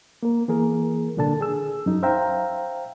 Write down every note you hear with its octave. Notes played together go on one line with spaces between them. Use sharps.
A#3 A#4
E3 A#3 G#4 A#4
C2 A#2 D3 D4 A4 A5
G#4 E6
F#2 D#4
C5 E5 F5 G5 A#5